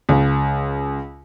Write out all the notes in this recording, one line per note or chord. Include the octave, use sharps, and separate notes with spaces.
C#2